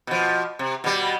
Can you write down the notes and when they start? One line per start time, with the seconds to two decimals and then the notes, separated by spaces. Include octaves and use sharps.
0.07 B2 F3
0.59 C3
0.84 B2 G3